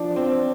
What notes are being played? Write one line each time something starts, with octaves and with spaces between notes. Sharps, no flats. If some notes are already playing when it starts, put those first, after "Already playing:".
Already playing: F3 D4
C4